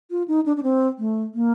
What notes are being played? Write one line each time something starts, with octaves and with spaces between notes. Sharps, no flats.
F4
D#4
D4
D4
C4
A3
A#3